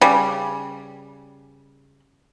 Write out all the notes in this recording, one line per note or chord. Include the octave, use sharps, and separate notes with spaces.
C#3 G3